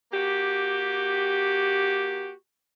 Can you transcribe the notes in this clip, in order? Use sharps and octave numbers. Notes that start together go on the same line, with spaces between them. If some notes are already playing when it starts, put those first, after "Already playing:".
A#3 F#4 G4